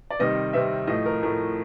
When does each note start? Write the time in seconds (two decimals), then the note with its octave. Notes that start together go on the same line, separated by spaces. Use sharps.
0.10 D5
0.19 C3 D#3 G3 C4 D#5
0.53 C3 D#3 G3 C4 E5
0.87 A2 F3 A3 D#5
1.05 A#4
1.22 A2 F3 A3 A#4